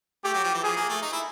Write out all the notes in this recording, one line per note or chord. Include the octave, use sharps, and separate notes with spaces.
A3 G4
F#3
F3
E3
F3 G#4
A#3
A3
D#4
E4